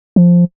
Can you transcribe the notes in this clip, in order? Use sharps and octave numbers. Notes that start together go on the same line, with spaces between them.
F3